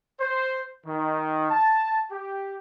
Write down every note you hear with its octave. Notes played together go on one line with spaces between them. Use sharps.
C5
D#3
A5
G4